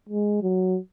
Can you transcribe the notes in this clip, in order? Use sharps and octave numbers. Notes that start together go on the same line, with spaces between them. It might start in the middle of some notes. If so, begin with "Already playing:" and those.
G#3
F#3